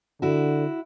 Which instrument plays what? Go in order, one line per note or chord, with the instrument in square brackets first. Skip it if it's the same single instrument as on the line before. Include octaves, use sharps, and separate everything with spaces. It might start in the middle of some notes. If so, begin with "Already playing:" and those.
[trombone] D3 [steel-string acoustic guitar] E4 F#4